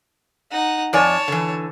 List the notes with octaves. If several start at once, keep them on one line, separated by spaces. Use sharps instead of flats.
D#4 F#5
F2 C#5 D5 G#5 A5
D3 E3